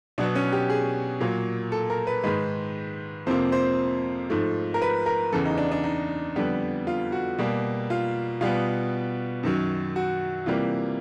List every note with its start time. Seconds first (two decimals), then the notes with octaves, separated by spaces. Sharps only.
0.18 B2 F#3 B3 D4
0.35 C#4
0.52 G4
0.70 G#4
1.20 A#2 F#3 A#3
1.72 A4
1.90 A#4
2.07 B4
2.23 G#2 D#3 G#3 B4
3.27 F2 C3 F3 A#3 C5
3.52 C5
4.30 G#2 F3 A3
4.74 A#4
4.82 B4
5.06 A#4
5.33 E2 C#3 E3 A4
5.46 D#4
5.58 D4
5.72 D4
5.84 D#4
6.36 F2 D3 G3 B3
6.87 F4
7.12 F#4
7.38 B2 G3 A#3
7.90 F4
8.41 B2 G3 B3 F4
9.43 F#2 D#3 F#3
9.96 F#4
10.46 C3 E3 G3 A#3 F4